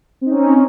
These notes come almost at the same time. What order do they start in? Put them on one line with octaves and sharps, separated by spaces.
C4 D#4 C#4